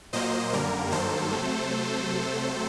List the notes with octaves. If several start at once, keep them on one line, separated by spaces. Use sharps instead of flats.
A#2 F#3 A#3 C5 D#5
F#2 D3 G3 A#3 A#4
G2 D#3 F#3 A#3 A4 C5
C3 F#3 A3